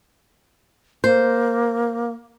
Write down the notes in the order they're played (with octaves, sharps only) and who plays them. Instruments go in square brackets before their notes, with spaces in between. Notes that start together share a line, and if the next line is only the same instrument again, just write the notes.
[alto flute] A#3 [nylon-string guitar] C5